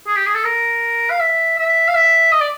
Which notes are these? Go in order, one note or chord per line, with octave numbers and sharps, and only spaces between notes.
G#4
G4
G#4
A4
A#4
F5
E5
E5
F5
E5
D#5
D5